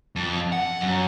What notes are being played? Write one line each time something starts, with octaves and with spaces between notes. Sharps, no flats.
F2
F#5
F#2